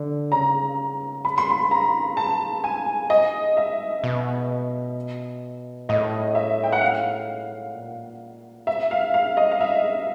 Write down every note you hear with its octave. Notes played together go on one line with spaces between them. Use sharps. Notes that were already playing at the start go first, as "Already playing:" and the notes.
Already playing: D3
C#3 A#5
B5
C6
B5
A#5
A5
G#5
D#5
E5
B2
A2 D#5
E5
G5
F#5
F5
A#2
B2 E5
F5
F5
D#5
F5
E5